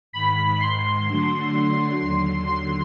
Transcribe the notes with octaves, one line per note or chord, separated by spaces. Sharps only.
G#2 D#3 G#3 B5
C6
D3 F#3 A3 D4 F#4
D#2 D3 F#3 C6
C6